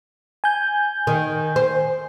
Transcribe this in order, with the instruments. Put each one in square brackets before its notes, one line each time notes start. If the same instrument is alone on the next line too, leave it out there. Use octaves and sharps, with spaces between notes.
[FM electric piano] G#5 G6
[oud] D#3
C5